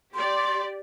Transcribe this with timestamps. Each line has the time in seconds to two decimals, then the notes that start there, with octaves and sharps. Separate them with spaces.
0.14 G4 D5 C6